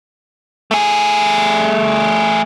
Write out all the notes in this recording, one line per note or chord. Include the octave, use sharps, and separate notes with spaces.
A3 G#4